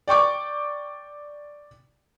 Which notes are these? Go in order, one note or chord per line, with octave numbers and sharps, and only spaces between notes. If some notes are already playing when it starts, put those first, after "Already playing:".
D5 G5 C#6 D6